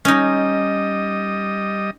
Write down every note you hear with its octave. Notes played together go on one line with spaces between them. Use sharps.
G3 C#4 D#4 D#5